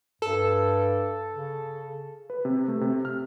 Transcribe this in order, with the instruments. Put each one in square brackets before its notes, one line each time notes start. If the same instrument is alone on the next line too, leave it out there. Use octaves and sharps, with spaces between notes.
[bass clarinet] G2 [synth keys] A4
[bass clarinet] C#3
[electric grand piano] B4
C3
A3
C3
F6